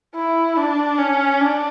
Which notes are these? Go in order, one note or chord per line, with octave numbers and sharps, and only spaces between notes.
E4
D4
C#4
D4